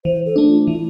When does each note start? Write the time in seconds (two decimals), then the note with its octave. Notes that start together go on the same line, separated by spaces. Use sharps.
0.05 E3 C5
0.25 A4
0.36 A3 D4
0.47 F4
0.67 E3 E4